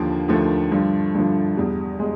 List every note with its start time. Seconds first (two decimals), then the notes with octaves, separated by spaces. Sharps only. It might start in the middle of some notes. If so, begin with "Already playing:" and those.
Already playing: D#2 D3 F3 A#3
0.28 D#2 D3 F3 A3
0.71 G2 D3 F3
1.15 G2 D3 F3
1.56 E2 B2 G3
1.99 B2 G#3